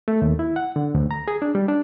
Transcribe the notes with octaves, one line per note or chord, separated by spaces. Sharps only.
A3
D#2
E4
F#5
D3
D2
A#5
G#4
D4
G3
D4